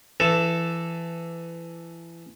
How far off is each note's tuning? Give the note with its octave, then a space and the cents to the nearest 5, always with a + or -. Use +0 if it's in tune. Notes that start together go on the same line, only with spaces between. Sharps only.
E3 +25 A4 +0